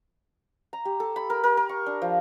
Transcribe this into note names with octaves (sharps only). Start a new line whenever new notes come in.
A#5
G4
A4
B5
A#4
A#4
A#4
C#6
D4
F3